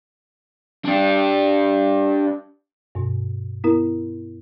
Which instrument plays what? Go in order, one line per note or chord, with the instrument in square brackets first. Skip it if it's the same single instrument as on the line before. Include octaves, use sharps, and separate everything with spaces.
[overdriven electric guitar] D4 G4
[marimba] G2 B2
B3 E4 A#4